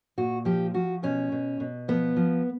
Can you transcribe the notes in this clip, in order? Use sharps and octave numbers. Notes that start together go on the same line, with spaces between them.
A#2 F#4
F3 G4
F3 F#4
B2 C#4
B2
B2
F3 B3
F3